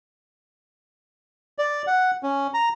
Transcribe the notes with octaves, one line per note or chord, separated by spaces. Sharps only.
D5
F#5
C#4
A#5